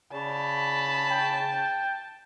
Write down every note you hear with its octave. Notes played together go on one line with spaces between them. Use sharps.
C#3 D5 A5 B5
G5